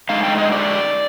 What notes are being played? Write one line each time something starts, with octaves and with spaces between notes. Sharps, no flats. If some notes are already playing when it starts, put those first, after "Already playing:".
D3 G#3 D#4 F5
G5
D#5
D5